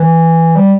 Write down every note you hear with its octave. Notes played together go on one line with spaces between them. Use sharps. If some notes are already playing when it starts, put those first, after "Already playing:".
Already playing: E3
G3